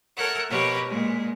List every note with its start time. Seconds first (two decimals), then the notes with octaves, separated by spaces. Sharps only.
0.17 A4 A#4 C#5 E5 F#5
0.50 B2 F3 G4 A#4 B4 C#5
0.87 A#2 G#3